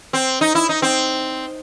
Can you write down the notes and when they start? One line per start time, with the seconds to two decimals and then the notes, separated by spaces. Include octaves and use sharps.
0.13 C4
0.41 D#4
0.55 E4
0.69 D#4
0.82 C4